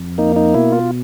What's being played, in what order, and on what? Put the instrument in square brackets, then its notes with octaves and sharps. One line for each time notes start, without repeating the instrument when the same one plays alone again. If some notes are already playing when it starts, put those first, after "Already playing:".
Already playing: [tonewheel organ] F2
A#3 D#4
D#4
B2 E4
F4